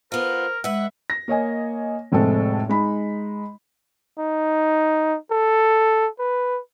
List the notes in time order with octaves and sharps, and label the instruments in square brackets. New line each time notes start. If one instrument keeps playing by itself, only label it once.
[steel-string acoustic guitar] B3 F4 [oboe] A#4 [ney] C5
[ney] G#3 [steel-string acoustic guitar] B4 F#5 [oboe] E5
[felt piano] A#6
A#3 C#5 D#5 G#5
F1 A2 G#3 C4 A4
G#3 D#4 B5
[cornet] D#4
A4
B4